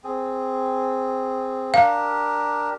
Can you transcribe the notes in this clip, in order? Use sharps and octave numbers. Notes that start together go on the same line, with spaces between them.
C4 G#4
D4 G4 A#4 F5